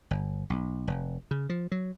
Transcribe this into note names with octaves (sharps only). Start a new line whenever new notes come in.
G1
B1
F1
C#3
F3
F#3